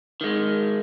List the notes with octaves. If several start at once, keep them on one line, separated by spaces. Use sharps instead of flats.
D#3 G#3